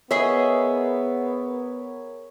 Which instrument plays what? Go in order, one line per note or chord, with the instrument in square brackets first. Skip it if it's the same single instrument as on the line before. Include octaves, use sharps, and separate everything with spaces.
[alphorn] B3 [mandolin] G#4 D#5 E5 [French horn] A#4 [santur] C#5